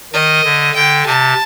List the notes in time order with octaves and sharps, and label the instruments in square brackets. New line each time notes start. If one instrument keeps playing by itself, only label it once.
[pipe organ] D#3 [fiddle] D#5
[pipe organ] D3
[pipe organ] D3 [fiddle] G5
[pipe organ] C3 [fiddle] A5